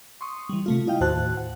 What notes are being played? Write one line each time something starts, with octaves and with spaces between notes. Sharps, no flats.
C6 C#6 D#6
E3 G3
C3 A3 F4
E4 D#5 F5 G5
D#2 A2 F#4 C5 A5 F#6
F#5